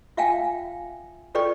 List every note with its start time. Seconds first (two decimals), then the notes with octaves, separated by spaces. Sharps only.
0.17 F4 E5 F5 G5 G#5
1.35 F4 A4 B4 D5 G5 C#6